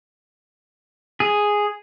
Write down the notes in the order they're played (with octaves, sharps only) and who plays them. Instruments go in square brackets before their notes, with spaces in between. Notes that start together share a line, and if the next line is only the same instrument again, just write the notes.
[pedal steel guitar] G#4